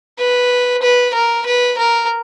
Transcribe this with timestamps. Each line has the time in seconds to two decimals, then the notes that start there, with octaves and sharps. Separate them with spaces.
0.18 B4
0.82 B4
1.14 A#4
1.46 B4
1.78 A#4